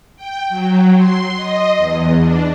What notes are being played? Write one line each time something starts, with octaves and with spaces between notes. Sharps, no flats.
G5
F#3
C6
D#5
E2
D4